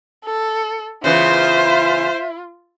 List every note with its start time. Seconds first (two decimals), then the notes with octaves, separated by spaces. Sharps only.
0.25 A4
1.04 C#3 E3 B3 F4 C5 E5